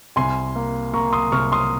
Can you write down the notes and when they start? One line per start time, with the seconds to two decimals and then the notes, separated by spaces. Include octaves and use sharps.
0.16 C2 G#5 C6
0.56 A#3
0.93 A#3 A#5 C#6
1.13 C6 D#6
1.32 C2 C#6 F6
1.52 C6 D#6